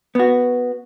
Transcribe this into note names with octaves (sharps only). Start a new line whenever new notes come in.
B3 F#4